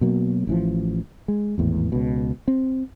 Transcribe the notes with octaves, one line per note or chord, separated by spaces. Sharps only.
B2 F#3 A#3
A1 E3 F3
G#3
G#1 E2 A2
C#2 B2
C4